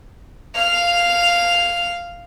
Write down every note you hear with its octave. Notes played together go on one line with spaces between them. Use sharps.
F5 F7